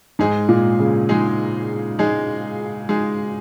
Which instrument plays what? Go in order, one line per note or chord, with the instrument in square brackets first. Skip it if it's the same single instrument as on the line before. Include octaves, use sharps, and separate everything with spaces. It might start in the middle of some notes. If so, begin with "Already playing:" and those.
[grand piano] G#2 [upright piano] G#3 D#4 G#4
[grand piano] A#2
C#3
[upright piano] G#3 D#4 G#4
G#3 D#4 G#4
G#3 D#4 G#4